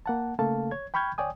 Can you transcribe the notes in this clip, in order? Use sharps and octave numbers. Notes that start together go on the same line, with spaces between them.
A#3 F#5 A5
C#3 A3 A#3 A4 F5 A5
C#5 G#6
G5 B5 C#6 F6 G6 G#6
D2 C#5 D5 G5 G#5 D#6